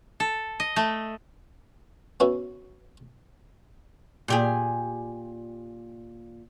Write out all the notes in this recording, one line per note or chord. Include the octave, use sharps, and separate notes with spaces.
A4
D#5
A3
B3 C#4 E4 F#4 B4 E5
A#2 G4 G#4